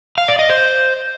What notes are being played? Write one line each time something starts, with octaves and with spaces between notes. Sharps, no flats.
F5
D5
D#5
C5